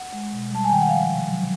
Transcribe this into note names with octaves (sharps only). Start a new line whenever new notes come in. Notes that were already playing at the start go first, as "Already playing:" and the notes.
Already playing: F#5
G#3
B2
G3 A5
G#5
D#3 G5
F#5
F3 F5
C3
F#3